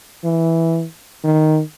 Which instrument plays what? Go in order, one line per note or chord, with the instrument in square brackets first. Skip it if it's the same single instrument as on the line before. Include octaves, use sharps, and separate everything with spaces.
[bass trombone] E3
D#3